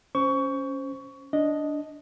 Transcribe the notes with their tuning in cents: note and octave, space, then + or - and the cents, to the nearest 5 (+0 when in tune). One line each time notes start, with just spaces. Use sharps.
C#4 +0 C5 +0 C#6 +20
D4 -5 D#5 +0